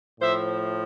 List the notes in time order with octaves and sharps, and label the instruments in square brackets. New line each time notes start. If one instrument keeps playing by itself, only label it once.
[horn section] A2 F3 C5 E5